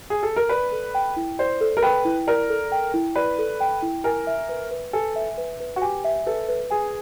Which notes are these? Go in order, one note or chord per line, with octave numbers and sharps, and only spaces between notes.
G#4
A4
A#4
B4 D5
A4
G5
E4
C5 D5
A4
A#4
B4 G5
E4
A#4 D5
A4
G5
E4
B4 D5
A4
G5
E4
A#4 G#5
E5
B4
B4
A4 G#5
E5
B4
B4
F#4
G4 G#5
E5
A4 B4
B4
G#4 G#5